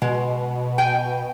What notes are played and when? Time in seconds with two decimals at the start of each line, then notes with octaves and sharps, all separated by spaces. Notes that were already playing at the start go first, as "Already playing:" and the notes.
0.02 B2 G#3
0.78 G5 G#5